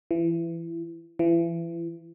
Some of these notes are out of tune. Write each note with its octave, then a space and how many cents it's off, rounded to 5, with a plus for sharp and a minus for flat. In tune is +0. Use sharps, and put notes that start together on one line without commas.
E3 +25
E3 +35